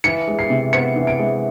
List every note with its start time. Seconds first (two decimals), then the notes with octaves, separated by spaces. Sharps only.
0.04 E3 C#7
0.28 G#3
0.39 C7
0.50 C3
0.73 B3 C#7
0.96 E3
1.07 D7
1.19 G#3